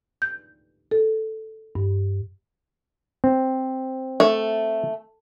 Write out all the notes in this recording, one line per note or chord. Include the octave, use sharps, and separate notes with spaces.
G6
A4
G2
C4
A3